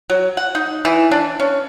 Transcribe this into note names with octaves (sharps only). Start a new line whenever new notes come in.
F#3
F#5
D#4
E3
D4
C#4